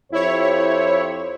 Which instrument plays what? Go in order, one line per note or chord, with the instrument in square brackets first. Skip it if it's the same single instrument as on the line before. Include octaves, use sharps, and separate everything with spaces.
[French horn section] F2 G4 C5 [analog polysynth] E4 C#5